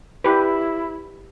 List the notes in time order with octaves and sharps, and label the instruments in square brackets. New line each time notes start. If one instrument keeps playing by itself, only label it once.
[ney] E4 [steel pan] G4 B4